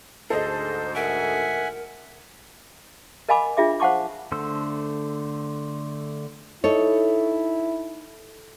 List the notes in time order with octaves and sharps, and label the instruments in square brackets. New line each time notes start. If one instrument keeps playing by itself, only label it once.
[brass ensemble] D2 G#2 [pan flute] G#4 [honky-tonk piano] A4 D#5 [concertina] C5
[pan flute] A#4 [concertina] E5 F#5 G#5
[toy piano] A#4 D#5 F5 G#5 B5 D6
D4 F4 G#4 E5 D6
C5 F5 F#5 A5 C#6 D6
[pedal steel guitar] D3 A3 C5 E6
[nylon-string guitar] D#4 C#5 [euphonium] E4 [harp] A4